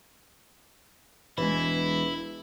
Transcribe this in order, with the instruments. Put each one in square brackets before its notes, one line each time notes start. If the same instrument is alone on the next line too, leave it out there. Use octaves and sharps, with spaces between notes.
[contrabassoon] E1 [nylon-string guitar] E3 G#3 [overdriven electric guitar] E4